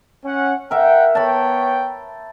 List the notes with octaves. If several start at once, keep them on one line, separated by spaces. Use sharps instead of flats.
C#4 F#5
A#4 E5 F#5 G5
B3 C#5 G5 A5 B5